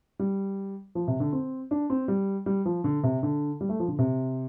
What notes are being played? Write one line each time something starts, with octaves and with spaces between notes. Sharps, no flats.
G3
F3
C3
D3
C4
D4
C4
G3
G3
F3
D3
C3
D3
G3
A3
F3
D3
C3